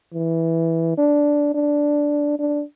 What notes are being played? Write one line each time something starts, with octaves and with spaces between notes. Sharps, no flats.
E3
D4
D4
D4